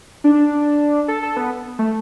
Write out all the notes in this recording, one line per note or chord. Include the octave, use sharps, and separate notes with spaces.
D4
A4
A4
B3
A3